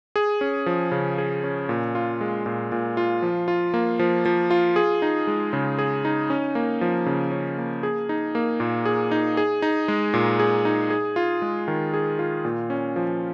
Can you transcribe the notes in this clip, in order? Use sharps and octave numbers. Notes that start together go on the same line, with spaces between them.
G#4
C#4
F3
C#3
G#4
C#4
A#2
F4
G#3
A#2
A#2
F4
F3
F4
A#3
F3
F3
F4
G#4
D#4
G#3
C#3
G#4
D#4
C#4
A#3
F3
C#3
C#4
A#3
G#4
D#4
A#3
A#2
G#4
D#4
G#4
D#4
G#3
A#2
G#4
D#4
G#4
F4
G#3
D#3
G#4
F4
A#2
C#4
F3